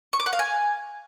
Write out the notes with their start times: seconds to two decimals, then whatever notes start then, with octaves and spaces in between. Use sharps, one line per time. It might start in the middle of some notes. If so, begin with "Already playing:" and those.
0.13 C#6
0.20 D6
0.26 F#5
0.33 F5
0.39 G#5